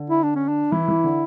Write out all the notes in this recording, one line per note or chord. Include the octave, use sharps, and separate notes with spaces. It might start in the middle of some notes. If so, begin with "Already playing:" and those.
Already playing: D3
E4
D4
C#4
D4
E3 E4
E3
D3